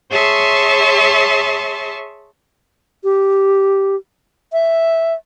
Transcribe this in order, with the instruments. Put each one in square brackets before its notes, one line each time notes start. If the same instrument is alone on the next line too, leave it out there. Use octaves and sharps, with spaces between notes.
[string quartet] G#4 C#5 E5 A5 C6 C#6
[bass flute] G4
E5